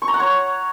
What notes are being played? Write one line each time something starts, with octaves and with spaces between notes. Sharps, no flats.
C#6
A#5
F#5
C#5